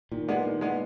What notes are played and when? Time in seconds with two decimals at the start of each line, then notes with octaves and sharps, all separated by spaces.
0.12 A#2 D#3
0.28 G#3 B3 D4
0.45 D#3
0.61 G#3 B3 D4